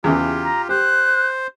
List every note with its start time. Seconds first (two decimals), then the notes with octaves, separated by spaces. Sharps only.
0.04 E2 C#3 E3 F4 G4
0.43 A#5
0.69 G4 C5 F#6